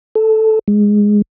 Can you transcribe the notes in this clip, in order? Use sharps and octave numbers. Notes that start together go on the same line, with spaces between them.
A4
G#3